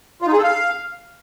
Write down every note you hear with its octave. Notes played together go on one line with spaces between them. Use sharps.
F4
D#4
G#4
A4
F5